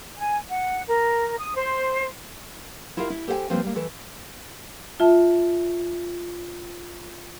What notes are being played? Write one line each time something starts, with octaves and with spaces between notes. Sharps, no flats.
G#5
F#5
A#4
D#6
C5
E4 F4 G4 A#4 E5 F5
E4
G4 A4 C5 E5 G5 G#5
F3 G3 A#3 C4 B4
G3 A#3
E3 A3 A4
F4 E5 A5